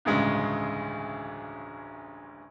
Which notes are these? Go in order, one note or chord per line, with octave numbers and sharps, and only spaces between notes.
A1 D2 G2 C#3 G#3